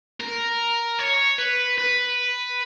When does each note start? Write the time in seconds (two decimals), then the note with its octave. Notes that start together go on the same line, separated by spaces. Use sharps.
0.21 A#4
0.99 C#5
1.39 B4
1.78 B4